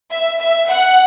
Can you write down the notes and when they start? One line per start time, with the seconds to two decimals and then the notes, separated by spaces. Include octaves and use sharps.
0.11 E5
0.39 E5
0.69 F#5